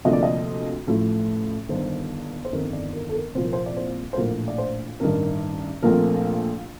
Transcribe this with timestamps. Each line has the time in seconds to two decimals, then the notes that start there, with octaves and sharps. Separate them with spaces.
0.05 D2 C3 F3 A#3 D#5
0.13 D5
0.23 D#5
0.87 A1 A2 F3 A3
1.69 G1 G2 D#3 C5
2.45 C5
2.52 G1 F2 D#3 A#4
2.73 D5
2.93 A#4
3.09 A4
3.15 A#4
3.35 C2 A#2 F3 C5
3.43 A#4
3.53 C5
3.66 D5
3.77 C5
4.13 C5
4.17 A#1 A2 F3 A#4
4.48 D5
4.58 C5
5.00 A1 G2 D#3 A#4
5.82 A#1 A#2 F3 A3 C4 A#4